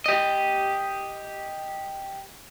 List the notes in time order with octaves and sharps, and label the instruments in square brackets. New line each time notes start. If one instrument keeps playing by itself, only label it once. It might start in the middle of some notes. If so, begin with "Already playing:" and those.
[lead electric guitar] G4 D#5